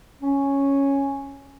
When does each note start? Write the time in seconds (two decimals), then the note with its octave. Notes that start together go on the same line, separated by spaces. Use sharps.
0.21 C#4